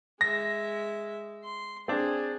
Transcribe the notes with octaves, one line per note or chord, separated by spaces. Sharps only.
G#3 E5 A#6
C6
C4 D4 G#4